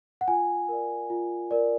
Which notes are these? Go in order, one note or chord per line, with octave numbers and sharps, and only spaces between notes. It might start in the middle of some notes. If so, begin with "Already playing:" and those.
F#5
F4 G#5
A#4 D5
F4
A#4 D5